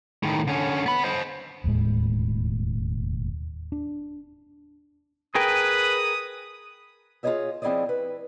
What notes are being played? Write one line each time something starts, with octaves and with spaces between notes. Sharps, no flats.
A2 D#3
D3 C#4
B3 B5
C5 D#5
E1 D#2 A2 G#3
D4
G#4 A#4 B4 G5 D#6
F4 G#4 B4 C#5 D#5 E5
F3 C4 E4 G#4 D5 D#5
B4